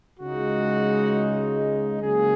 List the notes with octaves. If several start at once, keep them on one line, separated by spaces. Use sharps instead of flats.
C#2 C#3 G#3 D#4 F#4
C#2 C#3 F#3 A#3 G#4